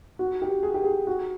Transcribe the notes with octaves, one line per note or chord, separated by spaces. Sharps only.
F#4
G4
G#4
G4
G#4
F#4